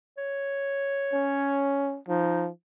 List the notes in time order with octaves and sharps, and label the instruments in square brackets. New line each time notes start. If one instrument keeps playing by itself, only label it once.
[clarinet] C#5
[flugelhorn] C#4
[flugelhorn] F3 [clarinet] D#4